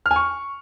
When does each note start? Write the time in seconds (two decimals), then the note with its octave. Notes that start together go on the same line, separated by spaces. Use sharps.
0.06 F6
0.11 G#5
0.16 C#6